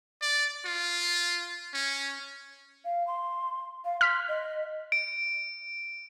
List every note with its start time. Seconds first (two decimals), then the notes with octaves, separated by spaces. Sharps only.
0.22 D5
0.66 F4
1.74 C#4
2.85 F5
3.07 C6
3.85 F5
4.01 C6 F6 B6
4.28 D#5
4.92 D7